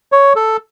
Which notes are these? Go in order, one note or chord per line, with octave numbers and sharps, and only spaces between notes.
C#5
A4